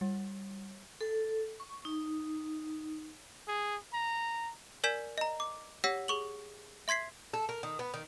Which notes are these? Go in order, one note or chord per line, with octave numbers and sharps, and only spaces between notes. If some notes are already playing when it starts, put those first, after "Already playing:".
G3
A4
C#6
D#4
G#4
A#5
A#4 D5 G#5 G6 B6 E7
D#5 A#5
D6
G4 C#5 F#5 E6 A#6 B6
G#4 C#6 F#7
E5 C6 G#6 B6 C7
A4
A#4
D#3
B3
D#3